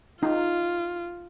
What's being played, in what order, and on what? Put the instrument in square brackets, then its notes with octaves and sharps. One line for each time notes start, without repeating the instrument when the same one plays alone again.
[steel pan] D#4 [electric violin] F4